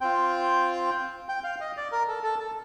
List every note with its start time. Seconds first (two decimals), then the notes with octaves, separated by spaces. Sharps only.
0.01 C4 F4 G5
1.29 G5
1.44 F5
1.60 D#5
1.77 D5
1.92 A#4
2.08 A4
2.24 A4
2.40 A4